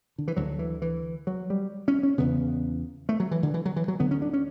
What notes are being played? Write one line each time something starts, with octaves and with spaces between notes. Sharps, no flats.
D3
E3
D2 D3 F#3
E3
E3
F#3
G3
C#4
C#4
E2 C#3 B3
A3
F#3
E3
D3
E3
F#3
E3
F#3
D2 D3 B3
C#4
D4
C#4